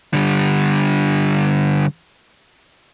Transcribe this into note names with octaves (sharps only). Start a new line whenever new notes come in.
D3 G3